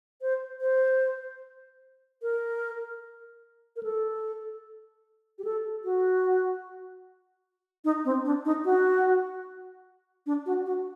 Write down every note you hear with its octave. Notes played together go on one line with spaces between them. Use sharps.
C5
C5
A#4
A#4
A4
G4
A4
F#4
D#4
C4
D4
D#4
F#4
D4
F#4
F#4